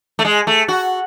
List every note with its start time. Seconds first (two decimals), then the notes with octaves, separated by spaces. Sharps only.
0.19 A3
0.25 G#3
0.47 A3
0.68 F#4